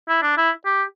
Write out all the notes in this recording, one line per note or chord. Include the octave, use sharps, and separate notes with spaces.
E4
D4
E4
G4